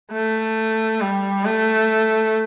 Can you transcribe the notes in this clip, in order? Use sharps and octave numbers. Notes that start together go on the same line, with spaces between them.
A3
G3
A3